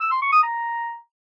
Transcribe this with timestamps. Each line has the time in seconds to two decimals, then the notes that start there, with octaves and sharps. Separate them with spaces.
0.01 E6
0.11 C6
0.22 C#6
0.32 D#6
0.43 A#5